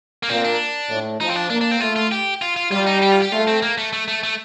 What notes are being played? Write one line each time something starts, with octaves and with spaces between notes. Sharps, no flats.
A#3
A#2 C4
D4
A2
F3 D#4
C4
D4
A#3 D4
D4
C4
A3 F4
F4
G4
F4
F4
G3 F4
D#4
G4
F4
G4
A3 F4
C4
A#3
A3
A3
A3
A3